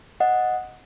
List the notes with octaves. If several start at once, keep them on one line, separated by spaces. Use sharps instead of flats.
D#5 F#5